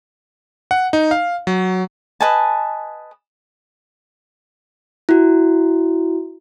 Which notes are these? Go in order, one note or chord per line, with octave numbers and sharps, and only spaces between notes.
F#5
D#4
F5
F#3
B4 D#5 G#5 A5
E4 F#4